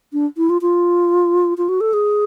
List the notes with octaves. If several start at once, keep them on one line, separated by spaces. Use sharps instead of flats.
D4
E4
F4
F4
F4
F#4
A4
G#4